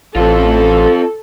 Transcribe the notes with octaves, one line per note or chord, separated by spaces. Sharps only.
A1 C4 F4 A4